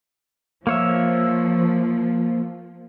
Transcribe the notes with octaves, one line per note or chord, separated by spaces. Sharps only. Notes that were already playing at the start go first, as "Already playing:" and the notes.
F3 A#3 C#5 E5